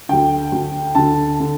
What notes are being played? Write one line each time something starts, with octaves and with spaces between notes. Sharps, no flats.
D2 D3 G5
D2 D3
D2 D3 A5
D3